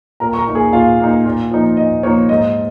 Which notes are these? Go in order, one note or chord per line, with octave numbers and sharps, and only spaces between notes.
A#2 A#4 A#5
C#6
A#4 A#5
A#3 D#4
G#4 G#5
A#2 F4 F5
A#3 D#4
A#2
F3 A#3 D#4
A#2 D#5
F3 A#3 D#4 C#5
G#2 D#5